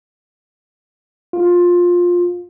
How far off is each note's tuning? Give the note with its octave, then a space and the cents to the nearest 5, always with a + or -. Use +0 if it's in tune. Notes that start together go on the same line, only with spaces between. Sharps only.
F4 +15